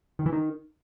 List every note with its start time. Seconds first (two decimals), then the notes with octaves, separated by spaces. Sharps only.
0.19 D#3
0.26 E3
0.33 D#3